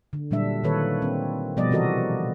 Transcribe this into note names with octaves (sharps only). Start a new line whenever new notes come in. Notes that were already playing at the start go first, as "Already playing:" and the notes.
D3
A#2 F#3 G3 D4 E5
D#3 A#3 A4 B4 C#5
C4
B2 F3 G3 B3 D5 D#5
C3 E3 F#4 A4 A#4 D#5